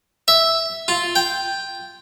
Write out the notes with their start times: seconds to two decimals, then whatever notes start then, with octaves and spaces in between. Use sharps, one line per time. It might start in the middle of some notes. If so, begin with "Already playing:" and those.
0.28 E5
0.88 F4
1.15 G5